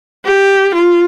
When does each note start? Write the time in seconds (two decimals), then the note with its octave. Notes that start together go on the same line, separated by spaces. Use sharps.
0.24 G4
0.74 F4